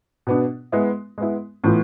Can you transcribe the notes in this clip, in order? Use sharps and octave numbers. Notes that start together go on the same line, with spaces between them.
B2 B3 D4
G#3 B3 E4
G#3 B3 E4
A2 E3 B3 F4